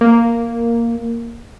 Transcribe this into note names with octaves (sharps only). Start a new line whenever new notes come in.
A#3